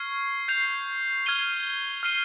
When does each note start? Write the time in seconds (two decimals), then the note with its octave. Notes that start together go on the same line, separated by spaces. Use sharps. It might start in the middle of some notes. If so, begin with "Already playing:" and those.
Already playing: C#6 F6 G#6 C7
0.48 G6 C7 F7
1.26 F6 G#6 C7 D#7 G7
2.03 F6 C7 D#7 G7